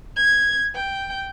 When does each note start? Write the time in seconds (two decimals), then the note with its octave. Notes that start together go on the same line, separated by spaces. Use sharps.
0.16 G#6
0.75 G5